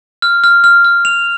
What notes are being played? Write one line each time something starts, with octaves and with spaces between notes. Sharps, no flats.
F6
F6
F6
F6
F7